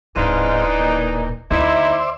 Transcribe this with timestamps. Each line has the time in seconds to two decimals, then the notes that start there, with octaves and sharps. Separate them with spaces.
0.16 D1 G#2 E3 C4 D4 D#4 F5
0.79 A#2
1.51 D2 D#4 E4 C5 D5 E5